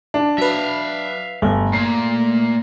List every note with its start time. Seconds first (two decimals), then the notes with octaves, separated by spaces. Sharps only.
0.14 D4
0.38 F#3 B4 E5 F5
1.42 G1 A3
1.73 A#2 C7